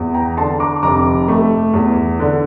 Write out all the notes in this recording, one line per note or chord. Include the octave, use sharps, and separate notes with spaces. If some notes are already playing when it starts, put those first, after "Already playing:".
Already playing: E2
G5 A#5
D3 A5 C6
A#5 D6
F1 A#5 D6
A3
E2
D3